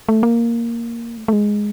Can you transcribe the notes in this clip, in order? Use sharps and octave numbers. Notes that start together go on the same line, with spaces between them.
A3
A#3
A3
A3
G#3